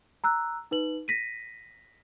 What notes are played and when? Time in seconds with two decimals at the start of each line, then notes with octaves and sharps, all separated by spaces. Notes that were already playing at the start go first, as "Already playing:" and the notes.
0.24 A#5 E6 F#6
0.71 D#4 B4 F#7
1.08 A#6 B6 D#7